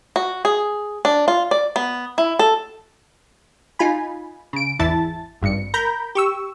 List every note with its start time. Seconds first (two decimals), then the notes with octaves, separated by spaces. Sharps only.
0.16 F#4
0.45 G#4
1.05 D4
1.28 F4
1.51 D5
1.76 B3
2.18 E4
2.39 A4
3.79 D#4 F4 G#5 B5
4.53 C#3 D7
4.79 G#1 E2 E3 E4 A5 A6
5.42 G#1 G2 C#7
5.74 A#4 A#5 B5 G6
6.15 G4 C#6 E6